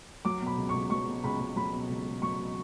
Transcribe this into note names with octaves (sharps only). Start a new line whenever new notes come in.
F#3 D6
B2
B5
C#2
C#2 C#6
F#3 C#6
B2
C#2 B5
C#2
F#3 B5
B2
C#2
C#2
F#3 C#6
B2